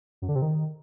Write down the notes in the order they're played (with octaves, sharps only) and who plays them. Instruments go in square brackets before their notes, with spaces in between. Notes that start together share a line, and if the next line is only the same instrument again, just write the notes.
[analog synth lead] F#2
D3
C3
D#3